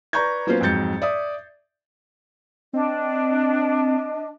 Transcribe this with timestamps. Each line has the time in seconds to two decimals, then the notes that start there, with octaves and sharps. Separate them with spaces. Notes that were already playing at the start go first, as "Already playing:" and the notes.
0.13 B4 D5 A#5 C#6 G6 G#6
0.47 F#3 A#3 B3 C#4 F4 C5
0.61 F2 G#2 F#3 G6 A6 C#7
1.02 D5 E5 D#6
2.73 C4 D4 D#5